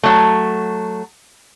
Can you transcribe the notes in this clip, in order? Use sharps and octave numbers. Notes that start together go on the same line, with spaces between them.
F#3 A3